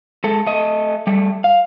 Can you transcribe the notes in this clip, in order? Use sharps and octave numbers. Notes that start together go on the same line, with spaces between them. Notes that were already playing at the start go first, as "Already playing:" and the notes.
G#3 A4
A3 D#5
G3 A3
F5